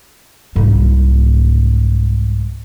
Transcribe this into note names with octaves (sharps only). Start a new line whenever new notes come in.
C2 G#2